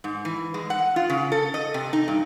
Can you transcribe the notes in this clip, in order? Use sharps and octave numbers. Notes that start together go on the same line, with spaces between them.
G#2
E3
G#3
F#5
F4
C#3
A4
D#5
C3
D#4
G2